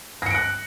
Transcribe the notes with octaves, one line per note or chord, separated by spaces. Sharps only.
F#6 A#6 C#7 D7